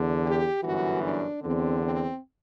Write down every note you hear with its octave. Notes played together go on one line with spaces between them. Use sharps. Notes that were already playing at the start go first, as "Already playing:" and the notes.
Already playing: E2 D3
G4
G1 F#2 E3 F#4
D4
E2 D3 C4
C4